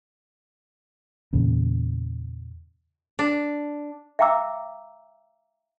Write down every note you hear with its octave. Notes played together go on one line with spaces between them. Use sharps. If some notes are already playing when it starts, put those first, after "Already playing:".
E2 A#2 C#3
D4
E5 F5 G5 A#5 D6 E6